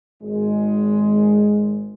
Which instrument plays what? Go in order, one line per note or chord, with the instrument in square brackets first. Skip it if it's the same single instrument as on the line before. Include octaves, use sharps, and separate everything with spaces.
[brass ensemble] G#1 G#3